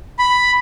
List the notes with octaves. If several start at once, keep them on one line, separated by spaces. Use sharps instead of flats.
B5